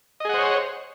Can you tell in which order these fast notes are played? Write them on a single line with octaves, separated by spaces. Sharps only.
D#5 G#4 F#5 C5 C#5